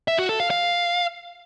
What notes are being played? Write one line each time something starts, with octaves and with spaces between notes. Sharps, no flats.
E5
F#4
A4
F5
F5